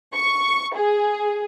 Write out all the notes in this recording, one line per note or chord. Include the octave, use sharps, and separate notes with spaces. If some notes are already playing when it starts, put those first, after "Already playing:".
C#6
G#4